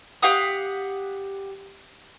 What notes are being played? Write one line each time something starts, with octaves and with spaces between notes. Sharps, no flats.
G4 F5 F#5 D#6